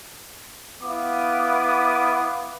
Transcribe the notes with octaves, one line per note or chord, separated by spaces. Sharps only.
B3 E4 F5 D6 D#6